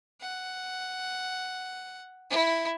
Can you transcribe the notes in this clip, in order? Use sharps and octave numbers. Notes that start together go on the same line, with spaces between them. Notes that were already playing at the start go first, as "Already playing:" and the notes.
F#5
E4